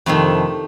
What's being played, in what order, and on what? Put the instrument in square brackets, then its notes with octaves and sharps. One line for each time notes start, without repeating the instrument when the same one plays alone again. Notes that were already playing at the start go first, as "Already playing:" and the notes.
[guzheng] F2 C3 D#3 A3